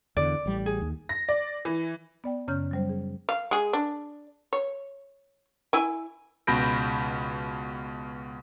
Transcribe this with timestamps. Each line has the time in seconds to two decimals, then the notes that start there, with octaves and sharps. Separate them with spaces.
0.17 E2 D3 D5
0.46 A1 G3
0.66 G#4
0.81 D#2
1.09 A#6
1.29 D5
1.65 E3
2.24 B3 D5 G5
2.48 F#2 C#3 C#4 C#5 F6 G6
2.71 F#3 G3 C5
2.89 G#4
3.29 F5
3.51 G#3 G#4
3.73 D4
4.53 C#5
5.73 E4 G#5
6.47 C#2 B2 B5 G6 A#6 D7